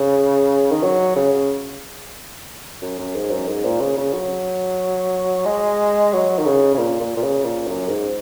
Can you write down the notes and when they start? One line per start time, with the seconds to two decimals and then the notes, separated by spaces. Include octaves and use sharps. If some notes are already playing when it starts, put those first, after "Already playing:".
Already playing: C#3
0.71 D#3
0.83 F#3
1.16 C#3
2.82 F#2
2.99 F#2
3.15 G#2
3.31 F#2
3.48 G#2
3.65 A#2
3.81 C#3
3.98 C#3
4.13 F#3
5.46 G#3
6.13 F#3
6.39 D#3
6.46 C#3
6.74 C#3
6.78 A#2
7.00 A#2
7.17 A#2
7.23 C#3
7.45 A#2
7.67 F#2
7.89 G#2